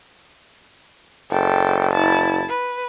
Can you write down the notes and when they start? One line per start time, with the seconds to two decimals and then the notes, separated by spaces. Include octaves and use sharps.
1.31 F#1 A4 G5
1.94 E4 A5
2.49 B4